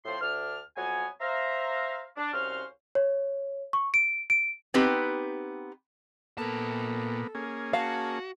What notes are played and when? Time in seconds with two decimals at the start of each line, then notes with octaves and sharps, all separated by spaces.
0.05 A2 F3 C4 C5 C6
0.20 D2 D4 F6
0.76 F2 F#3 B3 C#5 G#5
1.20 C5 E5 F5 A#5
2.16 D4
2.32 C2 C#4 F#4 C5 F5 F6
2.95 C#5
3.73 C#6
3.94 D7
4.30 D7
4.74 B3 C4 D#4 G4 B4
6.38 A#2 A#3 B3 A4 A5
7.35 A#3 C#4 G#4
7.73 F#4 F5 A5